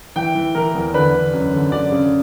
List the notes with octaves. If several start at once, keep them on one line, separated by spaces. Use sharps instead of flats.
E3 G5
E3
E3 A#4
E2
D3 B4
D3
F#2
D3
F#2 D5
C#3